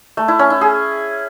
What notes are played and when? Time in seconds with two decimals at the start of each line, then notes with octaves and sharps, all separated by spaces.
0.17 A3
0.28 E4
0.39 C#4
0.50 E4
0.61 G#4